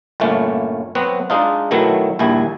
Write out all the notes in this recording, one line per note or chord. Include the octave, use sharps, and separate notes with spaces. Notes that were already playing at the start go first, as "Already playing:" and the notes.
G1 A#2 A3 C#4
F#3 B3 C4 F#4
G#3 D4 D#4 F4
B2 D#3 F#3 A3 E4
A#1 D#2 G3 E4 G#5